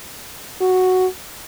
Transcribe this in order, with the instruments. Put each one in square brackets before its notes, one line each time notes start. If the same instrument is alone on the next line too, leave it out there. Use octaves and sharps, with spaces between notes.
[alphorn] F#4